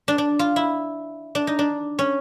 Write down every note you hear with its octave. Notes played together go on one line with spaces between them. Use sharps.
D4
D4
F4
E4
D4
D#4
D4
C#4